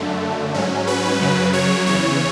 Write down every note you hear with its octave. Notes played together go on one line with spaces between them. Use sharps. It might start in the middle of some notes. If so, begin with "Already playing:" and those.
Already playing: F#2 D3 A3
G#2 F#3 C#4
B4
F#2 C#3 F#3
C#5
E2 C#3 E3 C#5